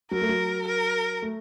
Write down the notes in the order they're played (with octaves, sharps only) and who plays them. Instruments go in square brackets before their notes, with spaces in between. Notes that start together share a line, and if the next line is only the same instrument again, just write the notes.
[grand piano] F#3 [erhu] A#4
[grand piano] A3
F#3
[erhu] A#4
[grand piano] A3